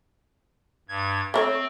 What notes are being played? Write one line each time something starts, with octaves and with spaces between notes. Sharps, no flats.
G2 G#6
A3 C4 A#4 C#5